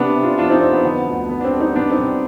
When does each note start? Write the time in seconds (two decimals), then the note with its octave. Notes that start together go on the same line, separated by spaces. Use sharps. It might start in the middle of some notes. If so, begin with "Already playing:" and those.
Already playing: C3 B3 D4
0.15 C3
0.23 D4 F4
0.38 F2 D4 F4
0.50 C4 D#4
0.61 F2 C4
0.72 B3
0.84 D3 B3
1.07 D2
1.29 D3 B3
1.40 D4
1.44 C4
1.53 G3
1.60 C4 D#4
1.75 C2 B3 D4
1.91 C4 D#4
1.98 C2